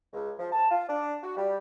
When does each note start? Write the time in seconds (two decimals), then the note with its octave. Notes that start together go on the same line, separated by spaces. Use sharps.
0.13 C#2
0.38 F3
0.52 A5
0.70 F4
0.88 D4
1.23 F#4
1.37 G3